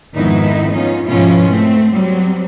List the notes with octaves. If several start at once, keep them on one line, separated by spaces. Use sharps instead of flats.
F2 G#2 D#3 B3 D#4 E4
B3 C#4 D#4 F4
G#2 B2 F3 C#4 E4 F4
A3 C4 C5
F#3 G3 C4